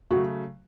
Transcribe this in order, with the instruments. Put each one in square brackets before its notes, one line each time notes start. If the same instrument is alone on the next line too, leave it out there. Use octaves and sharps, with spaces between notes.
[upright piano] C#3 F#3 A3 [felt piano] F#4